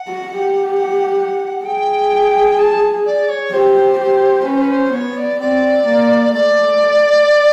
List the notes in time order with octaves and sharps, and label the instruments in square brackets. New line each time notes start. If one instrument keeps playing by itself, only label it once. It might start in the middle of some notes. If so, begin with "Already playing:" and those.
Already playing: [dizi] F#5
[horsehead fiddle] F#4
G4
[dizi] F#5
[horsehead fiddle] G#4 [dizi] G5
[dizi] A5
D5
C#5
[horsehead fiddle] G4 [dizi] C5
[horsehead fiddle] G4
[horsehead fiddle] C#4 [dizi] B4
[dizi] C5
B4
C5
[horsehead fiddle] B3 [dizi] C#5
[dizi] D5
[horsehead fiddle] C4 [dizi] D5
[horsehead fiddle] A#3
[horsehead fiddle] A3 [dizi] D5